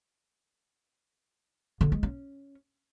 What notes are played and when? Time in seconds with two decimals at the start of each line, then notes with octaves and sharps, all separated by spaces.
1.81 D3
1.92 G#3
2.03 C#4